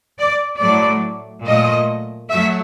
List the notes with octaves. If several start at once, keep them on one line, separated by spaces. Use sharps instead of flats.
D5
A2 F#3 A3 D5
A#2 F#3 A3 D#5
F#3 A3 E5